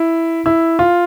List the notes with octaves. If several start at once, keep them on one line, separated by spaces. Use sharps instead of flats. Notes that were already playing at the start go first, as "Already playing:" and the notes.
Already playing: E4
E4
F4